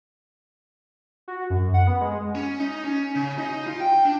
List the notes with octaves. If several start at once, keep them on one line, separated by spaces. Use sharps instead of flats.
F#4
F#2
F#5
B3
G#3
C#4
D#4
C#4
C#3
D#4
F4
G5
D4